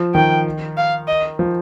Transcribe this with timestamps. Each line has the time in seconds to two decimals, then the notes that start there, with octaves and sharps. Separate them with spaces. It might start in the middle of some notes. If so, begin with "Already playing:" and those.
Already playing: F3
0.14 D#3 G5
0.77 F5
1.07 D#5
1.39 F3